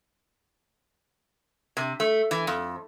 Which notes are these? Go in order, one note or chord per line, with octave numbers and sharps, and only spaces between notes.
C3
A3
E3
F2